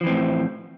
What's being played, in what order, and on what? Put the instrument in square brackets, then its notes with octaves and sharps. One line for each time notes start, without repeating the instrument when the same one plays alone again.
[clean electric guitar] F3
E3
C4
A2